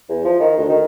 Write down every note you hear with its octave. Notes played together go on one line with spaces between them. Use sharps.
E2
F3
D#3
D2
D#3